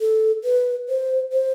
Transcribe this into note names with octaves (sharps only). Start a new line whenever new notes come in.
A4
B4
C5
C5